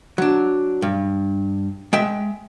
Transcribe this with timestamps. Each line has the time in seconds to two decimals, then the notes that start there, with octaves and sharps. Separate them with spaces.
0.18 F#3 D4
0.82 G2
1.93 G#3 E5 G5